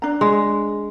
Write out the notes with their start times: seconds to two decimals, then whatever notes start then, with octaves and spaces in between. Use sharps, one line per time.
0.02 D4 A#5
0.21 G#3